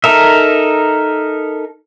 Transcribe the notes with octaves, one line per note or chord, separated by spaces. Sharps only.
D#4 A4 A#4 E5